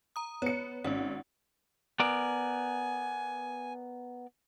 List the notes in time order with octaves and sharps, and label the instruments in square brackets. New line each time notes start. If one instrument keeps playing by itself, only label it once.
[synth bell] A#5 D#6
[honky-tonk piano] B3 C#7 [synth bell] C#5
[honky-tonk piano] G#1 [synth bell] C#4 F#5
[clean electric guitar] B3 A#4 D5 [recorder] G#5